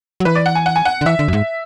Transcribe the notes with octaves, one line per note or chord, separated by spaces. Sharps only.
F#3
E3 B4
D5
F#5
G#5
F#5
G#5
F#5
D3
E3 E5
D3
F#2
G#2